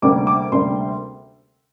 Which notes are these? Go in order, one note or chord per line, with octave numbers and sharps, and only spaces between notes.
D2 C3 G3 A#3 D4 D6
D6
D2 C3 G3 A#3 D4 C6